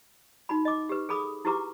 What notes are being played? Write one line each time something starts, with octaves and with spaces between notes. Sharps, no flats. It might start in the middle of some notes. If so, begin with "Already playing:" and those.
D#4 F#4 B5
D#5 D6
G4 B4
G#4 A4 B5 D6 D#6
E4 F#4 G4 B4 A#5 D6